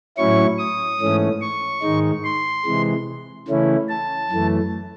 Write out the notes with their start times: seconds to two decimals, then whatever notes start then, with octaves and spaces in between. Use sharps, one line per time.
0.17 A2 F#3 C#4 E4 C#6
0.59 D#6
1.00 G#2 E3 A3 C#4
1.41 C#6
1.82 G#2 D#3 G#3 D#4
2.24 C6
2.65 C3 E3 G#3
3.48 C#3 E3 A3 C#4 E4
3.89 A5
4.31 F#2 E3 A3